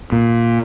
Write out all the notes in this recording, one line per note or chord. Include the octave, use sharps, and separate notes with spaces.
A#2